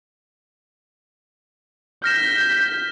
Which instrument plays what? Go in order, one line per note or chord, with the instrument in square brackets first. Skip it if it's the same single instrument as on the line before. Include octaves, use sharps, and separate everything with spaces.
[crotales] F6 A#6 E7 [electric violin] G6 B6